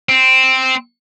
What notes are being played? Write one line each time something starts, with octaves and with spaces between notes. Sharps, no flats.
C4